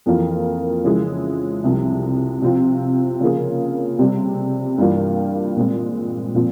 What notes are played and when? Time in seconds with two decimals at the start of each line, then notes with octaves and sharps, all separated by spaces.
0.06 F2 E3 A#3 F4 A#4
0.84 C#3 F3 G#3 E4 G#4
1.64 C2 C3 F3
2.42 C3 F3 C4 F4
3.20 C#3 F3 A#3 F4 G#4
3.98 C3 G3 C4
4.78 G2 E3 G3 A#3 F4
5.56 A#2 G#3 C4
6.35 A#2 F3 C4